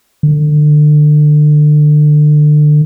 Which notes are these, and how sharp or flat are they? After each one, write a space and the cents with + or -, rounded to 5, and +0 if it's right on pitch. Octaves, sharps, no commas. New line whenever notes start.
D3 +30